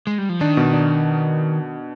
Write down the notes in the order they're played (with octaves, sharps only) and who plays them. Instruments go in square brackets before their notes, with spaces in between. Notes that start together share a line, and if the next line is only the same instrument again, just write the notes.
[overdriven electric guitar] G#3
G3
F3
[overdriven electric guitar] D#3 [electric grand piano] D4
[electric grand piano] B2
D4